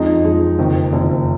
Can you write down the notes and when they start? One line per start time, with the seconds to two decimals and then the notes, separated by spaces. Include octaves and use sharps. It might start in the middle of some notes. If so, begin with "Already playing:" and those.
Already playing: F2 F3 G#3 D#4
0.24 F2 F3 G#3
0.58 F#1 F2 D#3
0.93 F#1 F2 D#3